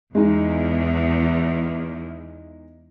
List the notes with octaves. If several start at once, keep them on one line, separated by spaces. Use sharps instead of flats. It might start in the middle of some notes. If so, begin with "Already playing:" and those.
E2 G#3 D#4